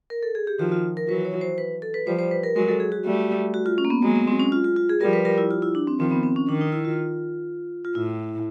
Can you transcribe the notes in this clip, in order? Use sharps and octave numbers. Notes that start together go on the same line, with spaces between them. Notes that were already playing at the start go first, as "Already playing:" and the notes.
A#4
A4
G#4
G4
D#3 F3 F#4
F4
A#4
E3 F#3 B4
C#5
C5
B4
A4
B4
F3 G3 C5
C5
B4
A#4
F#3 G#3 A#4
A4
G#4
F#4
G3 A3
F#4
F4
C#4
A#3
B3
F#3 G#3 A#3
B3
C4
C#4
F4
F4
F4
G#4
F3 G3 A#4
B4
A#4
E4
F4
E4
D4
C4
D#3 F3 C4
B3
C4
C#4
D#3 D4
D#4
E4
F4
F4
A2 E4